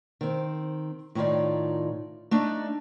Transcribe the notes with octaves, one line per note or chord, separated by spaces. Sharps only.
D#3 C4
A2 D#3 D#4 F4 C#5 D5
A3 D4 D#4